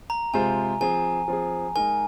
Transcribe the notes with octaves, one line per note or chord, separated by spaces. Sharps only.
A#5
C3 G#3 F4 C5 G#5
F3 C4 G#4 G#5
F3 C4 G#4
G#3 D#4 A#4 G#5